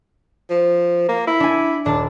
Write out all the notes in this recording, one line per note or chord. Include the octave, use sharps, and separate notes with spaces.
F3
A#3
E4
D4 G#5
D#1 D4 A5